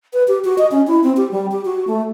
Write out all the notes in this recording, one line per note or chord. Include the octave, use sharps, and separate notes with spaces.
B4
G4
F#4
D#5
C#4
E4
C4
G4
G3
G4
F#4
A3